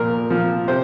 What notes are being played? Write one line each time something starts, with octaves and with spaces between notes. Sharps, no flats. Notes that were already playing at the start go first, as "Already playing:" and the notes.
Already playing: A#2 F3 A#4
F3
C3 C5